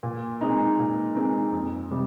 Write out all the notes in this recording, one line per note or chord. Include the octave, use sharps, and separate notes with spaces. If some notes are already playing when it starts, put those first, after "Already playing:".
A#2
G#3 C4 D#4
A#2
G#3 C4 D#4
F2
C3 G3